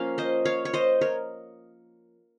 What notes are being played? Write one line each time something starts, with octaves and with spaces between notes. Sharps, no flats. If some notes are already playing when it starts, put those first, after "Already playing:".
Already playing: F3 A#3 C#4 F5
C5 D#5
C#5 F5
C#5
C5 D#5
A#4 C#5